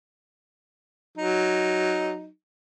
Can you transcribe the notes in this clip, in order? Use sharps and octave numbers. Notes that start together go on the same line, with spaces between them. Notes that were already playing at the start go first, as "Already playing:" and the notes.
F#3 D#4